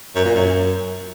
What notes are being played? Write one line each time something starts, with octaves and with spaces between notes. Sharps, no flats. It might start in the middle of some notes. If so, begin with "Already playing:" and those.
F#2
A#2
F#2